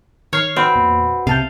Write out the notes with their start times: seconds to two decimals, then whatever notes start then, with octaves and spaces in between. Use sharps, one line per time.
0.33 D#3 C#5 F6 C7
0.56 C4 F#4 B4
0.75 E2 A#2
1.27 C2 C3 F5 A5 G6